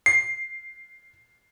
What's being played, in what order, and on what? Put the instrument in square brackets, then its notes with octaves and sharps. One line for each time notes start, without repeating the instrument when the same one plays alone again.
[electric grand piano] C7